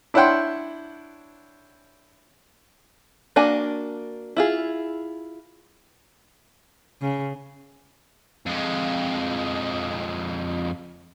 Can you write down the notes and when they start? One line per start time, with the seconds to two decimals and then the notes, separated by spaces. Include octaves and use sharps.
0.14 D4 E4 C#5 F#5 G5 C6
3.36 A#3 D4 F#4 G#5
4.36 E4 F4 G#4
7.02 C#3
8.46 F2 G#3